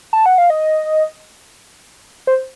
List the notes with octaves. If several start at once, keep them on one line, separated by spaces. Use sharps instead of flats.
A5
F#5
F5
D#5
C5